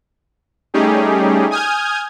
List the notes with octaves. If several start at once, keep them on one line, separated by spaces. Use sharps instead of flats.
G3 A3 C#4 D#4 G4 G#4
G#5 D#6 F6 G6 G#6